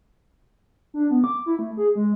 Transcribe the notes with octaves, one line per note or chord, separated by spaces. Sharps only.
D4
B3
D6
E4
A3
G#4
G#3